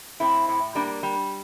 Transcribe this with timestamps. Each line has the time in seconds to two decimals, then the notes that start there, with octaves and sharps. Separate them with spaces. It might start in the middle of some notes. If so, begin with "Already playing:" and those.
0.20 A2 C4 E4
0.48 A2
0.75 G3 A#3 D4
1.03 G3